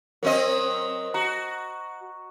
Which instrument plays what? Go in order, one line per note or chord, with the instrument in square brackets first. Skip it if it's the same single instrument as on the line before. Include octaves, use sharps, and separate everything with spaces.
[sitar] F#3 C4 D#5 [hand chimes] A#4
[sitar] F#4 [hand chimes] A#5